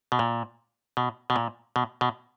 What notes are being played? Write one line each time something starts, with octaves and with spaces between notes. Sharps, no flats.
B2
A#2
B2
B2
A#2
B2
B2